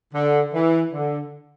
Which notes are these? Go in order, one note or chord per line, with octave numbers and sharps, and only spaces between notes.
D3
E3
D3